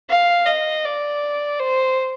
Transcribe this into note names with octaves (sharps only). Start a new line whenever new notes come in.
F5
D#5
D5
C5